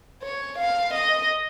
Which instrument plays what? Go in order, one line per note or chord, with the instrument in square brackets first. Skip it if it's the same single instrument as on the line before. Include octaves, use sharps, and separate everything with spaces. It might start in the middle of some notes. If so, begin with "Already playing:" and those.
[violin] C#5
F5
D#5